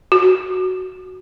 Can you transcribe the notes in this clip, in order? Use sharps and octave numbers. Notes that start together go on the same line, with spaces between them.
F#4